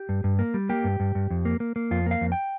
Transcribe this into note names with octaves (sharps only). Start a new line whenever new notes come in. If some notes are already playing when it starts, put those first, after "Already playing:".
Already playing: G4
G2
G2
A#3
G3
A#3 G4
G2
G2
G2
F2
A#3
A#3
A#3
F2 F4
A#3 F5
F2
G5